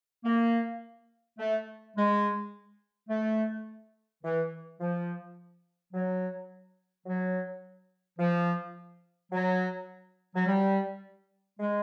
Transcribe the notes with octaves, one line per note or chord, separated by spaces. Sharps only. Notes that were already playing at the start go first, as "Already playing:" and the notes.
A#3
A3
G#3
A3
E3
F3
F#3
F#3
F3
F#3
F#3
G3
G#3